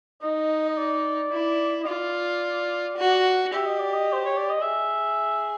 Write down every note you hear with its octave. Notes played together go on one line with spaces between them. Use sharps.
D#4 D#5
D#5
D5
E4
D#5
F4 D5
F#4
G4 E5
D#5
D5
D#5
C5
C#5
D5
D#5
G#4 E5